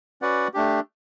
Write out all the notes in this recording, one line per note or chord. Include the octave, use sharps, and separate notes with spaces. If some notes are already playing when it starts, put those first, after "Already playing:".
C#4 F#4 B4 D5 F#5
A3 D4 G4